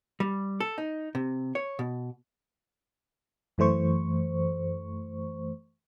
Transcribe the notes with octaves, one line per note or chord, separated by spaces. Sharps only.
G3
A4
D#4
C3
C#5
B2
F#2 E3 A3 C5 C#6